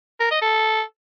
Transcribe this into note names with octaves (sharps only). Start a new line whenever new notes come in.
A#4
D#5
A4